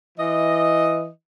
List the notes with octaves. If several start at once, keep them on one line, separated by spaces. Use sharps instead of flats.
E3 D#5